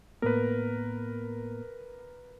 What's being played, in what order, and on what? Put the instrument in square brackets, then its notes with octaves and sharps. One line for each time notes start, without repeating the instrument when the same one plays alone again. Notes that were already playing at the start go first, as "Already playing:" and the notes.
[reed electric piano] A2 A#3 B3 [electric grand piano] A#4 B4